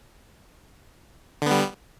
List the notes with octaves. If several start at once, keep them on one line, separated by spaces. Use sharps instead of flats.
D3 G3 B3